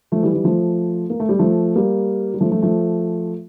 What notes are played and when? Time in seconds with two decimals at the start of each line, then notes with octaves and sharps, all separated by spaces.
0.12 F3 A3
0.23 E3 G3
0.33 E3 G3
0.44 F3 A3
1.10 A#3
1.20 A3
1.29 G3
1.39 F3 A3
1.76 G3 A#3
2.34 G3
2.41 F3 A3
2.51 F3 A3
2.62 F3 A3